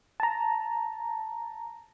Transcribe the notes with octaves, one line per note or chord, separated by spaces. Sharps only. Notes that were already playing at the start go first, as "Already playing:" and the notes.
A5 A#5